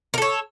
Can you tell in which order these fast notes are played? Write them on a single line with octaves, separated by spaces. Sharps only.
A#4 A4 C#5